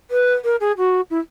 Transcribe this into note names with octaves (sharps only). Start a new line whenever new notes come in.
B4
A#4
G#4
F#4
E4